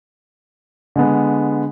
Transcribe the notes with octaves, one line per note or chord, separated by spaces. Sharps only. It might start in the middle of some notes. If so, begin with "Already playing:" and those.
D3 G#3 B3